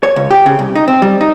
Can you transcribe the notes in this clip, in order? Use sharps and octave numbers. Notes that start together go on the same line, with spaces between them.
C#5
C#2
G4
C#3
C2
D#4
C4
G3
D#4